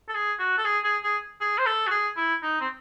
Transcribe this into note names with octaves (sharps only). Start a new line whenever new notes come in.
A4
G#4
F#4
A4
G#4
G#4
G#4
G#4
C5
A4
F#4
G#4
E4
D#4
C4